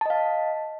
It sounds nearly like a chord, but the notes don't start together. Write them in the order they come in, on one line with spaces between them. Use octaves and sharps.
A5 D#5 F5